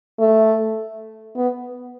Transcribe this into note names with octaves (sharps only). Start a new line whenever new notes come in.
A3
B3